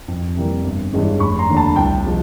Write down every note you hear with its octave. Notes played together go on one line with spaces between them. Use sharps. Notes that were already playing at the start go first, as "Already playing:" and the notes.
F2
C3 E3 G3 A#3
G1
G2 E3 G#3 C#4
F1 B5 C#6
A#5 C6
D#2 D3
A5 B5
C2 G5 A5
C3 F3 G#3